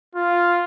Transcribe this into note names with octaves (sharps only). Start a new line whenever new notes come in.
F4